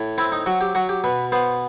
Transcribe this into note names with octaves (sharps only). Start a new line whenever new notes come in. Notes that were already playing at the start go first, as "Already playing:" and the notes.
Already playing: A2
C4 E4
D#4
F#3 F#4
G4
F#3 F#4
G4
B2 B4
B3 C5